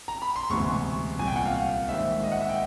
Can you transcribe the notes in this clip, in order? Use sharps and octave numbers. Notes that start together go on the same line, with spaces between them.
A#5
B5
C6
E1 D2 C3 E3 C#6
C2 A#2 G#5
G5
F#5
F5
A#1 G#2 D#3 E5
D#5
F#5
E5
G5